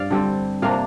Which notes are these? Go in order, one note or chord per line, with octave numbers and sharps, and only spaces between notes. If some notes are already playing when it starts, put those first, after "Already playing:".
Already playing: G2 D5 F5
D3 G3 C4
C3 A#3 D4 F5